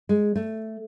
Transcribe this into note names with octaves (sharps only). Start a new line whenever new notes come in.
G#3
A3